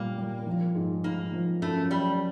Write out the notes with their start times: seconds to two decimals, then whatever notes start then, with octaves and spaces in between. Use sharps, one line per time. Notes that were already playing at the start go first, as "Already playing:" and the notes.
Already playing: A#2 G3 A#3
0.18 G3
0.47 F3
0.75 G#2
1.04 G#2 A#3
1.33 F3
1.62 F#2 A3
1.91 F#3 G3